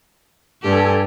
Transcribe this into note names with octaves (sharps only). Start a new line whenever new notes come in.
G2 G4 A4 G#5